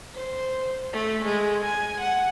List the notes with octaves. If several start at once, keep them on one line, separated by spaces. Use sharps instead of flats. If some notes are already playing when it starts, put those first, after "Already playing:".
C5
A3
G#3
G#5
F#5